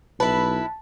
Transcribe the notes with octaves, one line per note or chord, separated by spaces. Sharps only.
B1 E4 B4 A5